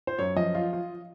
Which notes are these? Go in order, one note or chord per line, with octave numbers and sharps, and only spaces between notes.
C5
F#2 C#5
F3 D#5
F4
F4